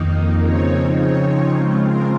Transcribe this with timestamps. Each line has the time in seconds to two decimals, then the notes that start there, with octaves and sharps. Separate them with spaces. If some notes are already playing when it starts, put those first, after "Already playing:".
Already playing: F2 D#3 A#3 D#4
0.39 C#3 F3 C4 D#4 C#5
0.96 C#5
1.52 C#3 G#3 C4 F4
1.81 A#4